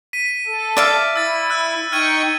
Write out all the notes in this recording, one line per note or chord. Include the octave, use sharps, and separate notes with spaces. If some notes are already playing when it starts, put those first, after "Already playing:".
B6 D#7
A4
D5 E5 F5
E4 E6 A6
E6 F#6
D#4 G5 C#6 F6 G#6 D#7